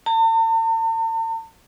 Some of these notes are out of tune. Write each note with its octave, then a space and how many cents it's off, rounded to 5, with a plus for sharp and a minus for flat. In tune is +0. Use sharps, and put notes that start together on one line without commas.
A5 +45